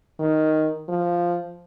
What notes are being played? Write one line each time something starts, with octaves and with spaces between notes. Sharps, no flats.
D#3
F3